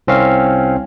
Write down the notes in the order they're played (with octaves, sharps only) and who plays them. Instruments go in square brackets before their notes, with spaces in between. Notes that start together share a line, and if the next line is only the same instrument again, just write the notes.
[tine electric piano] C2 C4 C#4 F5